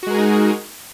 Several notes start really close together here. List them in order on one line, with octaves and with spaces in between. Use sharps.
F#4 G#3 A#4 G#4 D#4